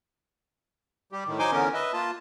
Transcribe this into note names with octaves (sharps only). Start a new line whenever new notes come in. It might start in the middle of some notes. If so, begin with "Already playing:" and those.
G3 G4
A2 D#3
F#3 D#4 C5 G#5 C6 D6
D3 E3 B3 C#4 A#4
B4 D#5 E5
A#3 F4 A5